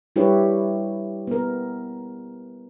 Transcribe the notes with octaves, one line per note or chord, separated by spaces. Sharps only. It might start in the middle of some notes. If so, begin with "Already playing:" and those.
G3 E4 G4 B4 C#5
B3 A#4